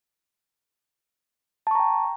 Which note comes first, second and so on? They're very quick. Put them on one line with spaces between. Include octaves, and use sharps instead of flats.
A5 C#6 A#5 G5